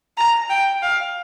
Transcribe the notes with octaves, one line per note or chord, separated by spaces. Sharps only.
A#5
G5
F5